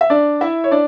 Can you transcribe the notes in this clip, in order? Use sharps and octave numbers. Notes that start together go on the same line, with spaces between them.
E5
D4 D5
E4 E5
C#5
D4 D5